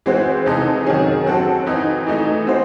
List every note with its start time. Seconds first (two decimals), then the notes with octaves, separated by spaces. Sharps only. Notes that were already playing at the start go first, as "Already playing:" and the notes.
0.06 E3 G#3 C4 F#4 C5
0.46 C3 E3 G#3 D#4 A4
0.86 D#3 F#3 C#4 G#4
1.26 F#3 C4 F#4 A4
1.66 E3 C4 D#4
2.07 E3 A3 D#4
2.47 C4 F#4 C5